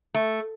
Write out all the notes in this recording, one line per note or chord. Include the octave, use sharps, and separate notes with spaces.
A3